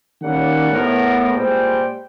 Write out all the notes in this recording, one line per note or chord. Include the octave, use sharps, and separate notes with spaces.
D#3 G3 A#3 C#4 F#5
A2 B3 A#4
A#2 G3 G#3 C5 G5